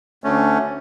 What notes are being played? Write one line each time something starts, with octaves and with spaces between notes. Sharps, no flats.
D2 A3 C#4